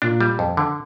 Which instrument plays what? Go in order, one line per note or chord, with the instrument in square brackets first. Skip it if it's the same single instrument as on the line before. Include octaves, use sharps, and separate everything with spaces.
[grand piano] A#2 [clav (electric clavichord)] D4
[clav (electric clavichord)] G3
F2
D3